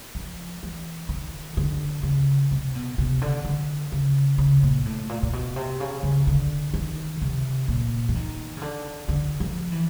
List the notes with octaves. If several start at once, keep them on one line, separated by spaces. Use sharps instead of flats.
F3
E3
D#3
D3
C#3
C3
B2
C3
D3
D3
C#3
C#3
A#2
A2
A#2
A#2
B2
C3
C#3
C#3
D3
D#3
C3
A#2
E3
D#3
C#3
D3
D3
F3
E3